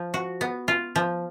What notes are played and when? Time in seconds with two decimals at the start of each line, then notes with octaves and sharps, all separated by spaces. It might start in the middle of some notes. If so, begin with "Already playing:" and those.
Already playing: F3
0.14 F#4
0.41 B3
0.68 F4
0.96 F3